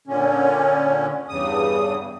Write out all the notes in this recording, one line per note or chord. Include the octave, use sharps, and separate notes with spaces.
A#2 D3 C#4
E2 G2 C#3 D#6